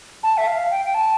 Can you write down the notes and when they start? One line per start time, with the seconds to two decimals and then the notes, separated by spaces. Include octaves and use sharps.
0.23 A5
0.37 E5
0.47 F5
0.71 G5
0.85 G5
0.94 A5